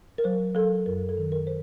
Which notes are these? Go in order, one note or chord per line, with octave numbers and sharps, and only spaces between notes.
A#4
F#3 C5
F#3 A4
F#2 A#4
A4
D#3
A#4
C5